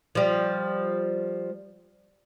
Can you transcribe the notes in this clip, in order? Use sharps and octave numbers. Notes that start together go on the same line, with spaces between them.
F3 G3